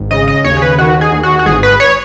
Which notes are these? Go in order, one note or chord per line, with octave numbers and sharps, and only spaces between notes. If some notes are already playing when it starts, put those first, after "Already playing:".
Already playing: G#1
C#3 D#5
D#5
D#2 C#5
G#4
B4
D#3 F#4
G#4
D#2
F#4
F#4
G#1 G#4
B4
C#5